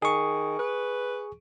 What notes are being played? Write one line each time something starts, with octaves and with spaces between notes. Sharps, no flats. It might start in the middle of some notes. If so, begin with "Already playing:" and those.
D#3 G#4 C#6
B4